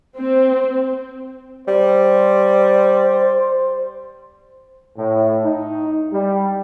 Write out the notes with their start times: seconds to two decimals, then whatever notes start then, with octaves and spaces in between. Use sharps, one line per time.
0.18 C4
1.68 G3 C5
4.98 A2
5.45 D#4
6.13 G3